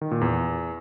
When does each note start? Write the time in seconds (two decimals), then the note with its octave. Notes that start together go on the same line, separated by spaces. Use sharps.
0.01 D#3
0.11 A#2
0.21 E2